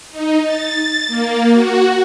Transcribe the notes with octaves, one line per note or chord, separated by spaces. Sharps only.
D#4
A6
A#3
F#4